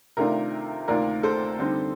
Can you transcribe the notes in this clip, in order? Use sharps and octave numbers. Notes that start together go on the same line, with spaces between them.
C3 D#3 A3 D4 F4 A#4
D2 C3 D#3 A#3 F4 A#4 D5
A4 C5
D3 G3 C4 D#4